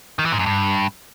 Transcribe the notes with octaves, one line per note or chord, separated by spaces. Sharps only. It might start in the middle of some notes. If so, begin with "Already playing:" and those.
D#3
E3
G#2
F#2
G2